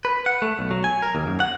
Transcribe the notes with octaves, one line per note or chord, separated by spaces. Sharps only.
B4
F#5
A3
B1
F#3
G#5
A#4
D#2
F#2
F#5